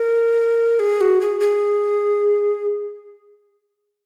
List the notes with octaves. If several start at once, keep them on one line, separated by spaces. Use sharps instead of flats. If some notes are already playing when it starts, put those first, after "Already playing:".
Already playing: A#4
G#4
F#4
G#4
G#4